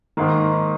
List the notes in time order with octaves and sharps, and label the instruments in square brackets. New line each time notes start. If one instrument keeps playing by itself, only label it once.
[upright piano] G#2 D#3 A#3